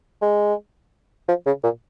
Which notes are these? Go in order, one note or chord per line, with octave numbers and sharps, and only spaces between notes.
G#3
F3
C#3
A#2